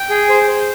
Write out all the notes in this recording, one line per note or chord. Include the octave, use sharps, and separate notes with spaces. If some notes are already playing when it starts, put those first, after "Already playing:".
Already playing: G5
G#4
C5
C5